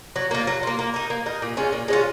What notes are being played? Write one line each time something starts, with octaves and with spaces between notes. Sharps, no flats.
F#3
A#3 F4
F#3
A#3 F4
A#3
D#4 A#4
A#3
D#4 A#4
A#2
G#3 C#4 F4
A#2
G#3 C#4 F4